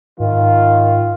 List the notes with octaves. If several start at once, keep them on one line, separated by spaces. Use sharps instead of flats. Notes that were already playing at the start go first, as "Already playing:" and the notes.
G#2 D#3 F4